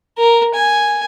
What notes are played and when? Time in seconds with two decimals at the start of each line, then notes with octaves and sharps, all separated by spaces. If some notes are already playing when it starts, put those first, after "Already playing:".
0.18 A#4
0.54 G#5